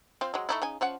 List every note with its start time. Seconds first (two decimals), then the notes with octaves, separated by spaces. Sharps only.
0.21 C4 F4
0.34 F#3 G#3
0.49 A3 D#4 E4
0.62 C#3 D#4 G#5
0.81 F3 C#4 F#5